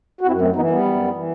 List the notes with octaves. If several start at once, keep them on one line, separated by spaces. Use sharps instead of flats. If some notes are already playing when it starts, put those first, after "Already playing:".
F#4
F#2 C4 E4
A3 C4
E3 B3 D#4
G3 B3
F#2
E3